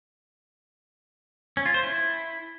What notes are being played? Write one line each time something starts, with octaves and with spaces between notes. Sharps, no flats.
C#4
F4
C5
E4